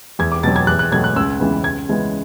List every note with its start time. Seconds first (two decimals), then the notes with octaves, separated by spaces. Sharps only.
0.19 E2 G#6
0.32 D6
0.43 B2 F#3 A6
0.56 G#6
0.67 E2 F#6
0.79 F#6
0.92 B2 F#3 A3 G#6
1.04 F#6
1.16 C#2 E6
1.39 C#3 E3 G#3 B3
1.63 C#2 G#6
1.89 C#3 E3 G#3 B3